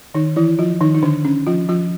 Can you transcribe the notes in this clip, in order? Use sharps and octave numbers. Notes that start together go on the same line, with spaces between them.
D#3 D#4
E3 E4
F3 F4
D#3 D#4
D#4
D3 D4
C#4
F3 F4
F3 F4